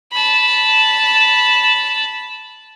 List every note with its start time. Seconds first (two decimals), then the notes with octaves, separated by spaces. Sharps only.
0.12 A5 B5